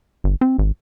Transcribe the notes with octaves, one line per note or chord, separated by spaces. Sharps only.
G1
C4
G#1